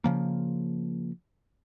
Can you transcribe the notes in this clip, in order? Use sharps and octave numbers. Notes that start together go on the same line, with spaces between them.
C#3 F3 A#3